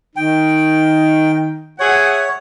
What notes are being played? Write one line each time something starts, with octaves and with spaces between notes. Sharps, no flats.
D#3 D#4 G5
G#4 C#5 E5 F#5